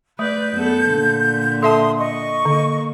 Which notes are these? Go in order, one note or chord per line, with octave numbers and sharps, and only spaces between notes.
A3 B4 D5 G6
F#2 B3 A4
A#2 D3
A4 E5 A5 C6 D#6
D#5 C#6
D3 A#3